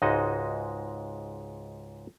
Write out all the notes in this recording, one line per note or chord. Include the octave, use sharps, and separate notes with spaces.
C#2 G#2 G#3 D#4 F#4 D#5